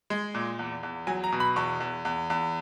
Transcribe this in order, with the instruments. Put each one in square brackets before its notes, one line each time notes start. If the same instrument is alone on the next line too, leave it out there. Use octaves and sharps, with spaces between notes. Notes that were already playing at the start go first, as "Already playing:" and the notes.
[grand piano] G#3
A#2
E2
E2
F#3 G#5
A#5
B2
B5
E2 C#6
E2
E2
E2